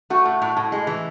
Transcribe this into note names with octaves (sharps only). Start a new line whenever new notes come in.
A3 F#4
A2
A2
A2
G#3
E3